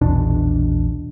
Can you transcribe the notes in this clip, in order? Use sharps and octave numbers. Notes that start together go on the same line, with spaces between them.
A#1 E2 B2 D4